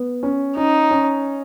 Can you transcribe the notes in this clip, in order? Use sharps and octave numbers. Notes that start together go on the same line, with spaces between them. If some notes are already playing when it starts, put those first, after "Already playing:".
Already playing: B3
C#4
C#4 D#4
C#4